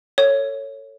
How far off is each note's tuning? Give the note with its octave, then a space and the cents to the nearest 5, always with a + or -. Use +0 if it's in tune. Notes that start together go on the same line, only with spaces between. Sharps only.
A4 +25 C#5 +0